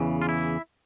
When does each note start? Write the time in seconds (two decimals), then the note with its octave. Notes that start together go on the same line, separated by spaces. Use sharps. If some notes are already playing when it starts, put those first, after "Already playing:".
Already playing: E2 C#3 E3
0.22 F4
0.29 E4